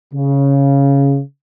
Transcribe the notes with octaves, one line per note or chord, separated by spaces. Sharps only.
C#3